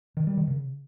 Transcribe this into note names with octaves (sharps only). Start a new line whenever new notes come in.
D#3
G3
D#3
C#3